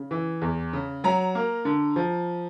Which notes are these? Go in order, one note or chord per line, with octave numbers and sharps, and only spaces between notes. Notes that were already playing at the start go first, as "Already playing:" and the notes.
Already playing: C#3
E3
E2
C#3
F#3 A#5
A#3
D3
F3